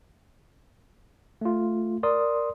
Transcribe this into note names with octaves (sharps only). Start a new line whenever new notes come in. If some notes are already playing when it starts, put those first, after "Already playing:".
A3 F4
A#4 D5 C6 D#6